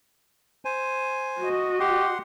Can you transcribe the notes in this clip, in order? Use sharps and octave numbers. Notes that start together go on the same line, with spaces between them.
C5 G#5
F#4 D#5
G4 F#5 C6